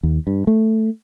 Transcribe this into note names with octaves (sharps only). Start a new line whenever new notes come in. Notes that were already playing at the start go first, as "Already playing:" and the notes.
D#2
G2
A3